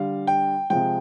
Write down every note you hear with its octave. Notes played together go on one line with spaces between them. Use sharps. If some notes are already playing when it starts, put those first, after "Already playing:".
Already playing: D3 G3 F5
G5
C3 F3 G#3 G5